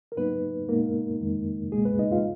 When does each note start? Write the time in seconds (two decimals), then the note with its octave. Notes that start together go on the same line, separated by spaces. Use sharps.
0.12 A#4
0.17 G#2 F#3 A#3 B3 D#4 B4
0.68 A#2 G#3 A#3 B3 D#4 A#4
1.21 F2 D#3 G#3 D#4
1.72 C#2 B2 G#3 A#3 G#4
1.85 B3 B4
1.99 D#4 D#5
2.12 F4 F5